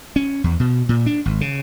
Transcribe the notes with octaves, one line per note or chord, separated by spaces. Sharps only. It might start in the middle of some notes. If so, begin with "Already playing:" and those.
C#4
E2
B2
A#2
D4
G#1
C#3